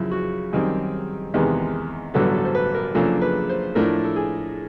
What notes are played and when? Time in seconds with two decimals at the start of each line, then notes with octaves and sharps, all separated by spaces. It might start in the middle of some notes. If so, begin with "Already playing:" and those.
Already playing: F#2 C#3 F3 E4
0.11 F#4
0.53 F#2 D#3 G3 C4 G#4
1.34 E2 C3 D#3 G#3 B3
2.14 A1 G2 D3 F#3 B3 A4
2.35 A4
2.45 C5
2.55 B4
2.74 A#4
2.95 F#2 C#3 F3 A#3 D4 A4
3.22 B4
3.49 C5
3.75 A2 F3 A3 D4 A#4
4.04 A4
4.16 G#4